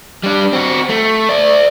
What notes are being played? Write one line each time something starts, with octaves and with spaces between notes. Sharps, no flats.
G3 D4
C4 F#4
A3
D5 E5